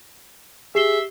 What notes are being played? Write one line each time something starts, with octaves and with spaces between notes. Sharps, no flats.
G4 G#4 E5 C7 G7